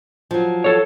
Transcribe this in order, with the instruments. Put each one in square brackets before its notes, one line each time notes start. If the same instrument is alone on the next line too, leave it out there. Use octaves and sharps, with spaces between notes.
[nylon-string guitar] F3 F#3
[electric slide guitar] A4 C#5